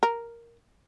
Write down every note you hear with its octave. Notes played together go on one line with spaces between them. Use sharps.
A#4